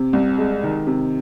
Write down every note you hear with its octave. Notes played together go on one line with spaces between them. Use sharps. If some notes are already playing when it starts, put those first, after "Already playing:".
Already playing: C3
C2
G#3
D#3
C3